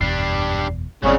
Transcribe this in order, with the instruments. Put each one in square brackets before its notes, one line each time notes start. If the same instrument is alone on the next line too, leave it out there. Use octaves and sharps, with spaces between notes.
[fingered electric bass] F#1 E2 B2 [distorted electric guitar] G3 D4 [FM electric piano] C7
[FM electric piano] G1 C4 D5 [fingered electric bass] G2 [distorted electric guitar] A#2 F#3 [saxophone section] C#3